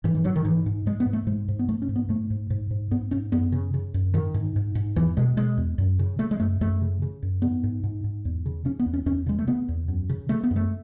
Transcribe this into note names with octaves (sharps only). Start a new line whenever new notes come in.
G#2 E3
E3
G#2 F#3
D#3
G#2 E3
G#2
G#2 G#3
B3
G#2
A3
G#2 G#3
G#2
B3
G#2 A3
C#4
G#2
B3
G#2 A3
G#2
G#2
G#2
G#2 B3
G#2 C#4
F#2 B3
C#3
C#3
F#2
G#2 D#3
G#2
G#2
G#2
E2 E3
B2 G#3
B2 G#3
E2
F#2
C#3
C#3 A3
G#3
F#2 A3
F#2 A3
C#3
C#3
F#2
G#2 B3
G#2
G#2
G#2
E2
C#3
C#3 C#4
B3
E2
C#4
E2 C#4
C#3 G#3
A3
C#3 B3
E2
F#2
C#3
C#3 A3
B3
F#2
A3